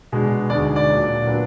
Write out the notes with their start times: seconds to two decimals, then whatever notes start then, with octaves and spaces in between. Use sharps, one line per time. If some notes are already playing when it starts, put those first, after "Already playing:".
0.12 B2 G#3 D4
0.50 D2 D3 G#3 D#4 D5
0.76 D5
0.88 A#2 F#3 D4
1.27 A#2 F#3 B3 D4